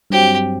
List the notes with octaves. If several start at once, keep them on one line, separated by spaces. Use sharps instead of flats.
G2 F#3 C4 G4